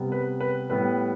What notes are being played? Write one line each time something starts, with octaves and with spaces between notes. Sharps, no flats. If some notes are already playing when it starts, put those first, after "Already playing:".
Already playing: C3 G3 B3
B4
B4
A2 G3 B3 B4